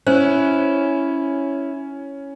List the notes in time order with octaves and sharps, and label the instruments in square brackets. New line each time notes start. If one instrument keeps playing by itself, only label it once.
[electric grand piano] C#4 [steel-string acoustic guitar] E4 [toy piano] C5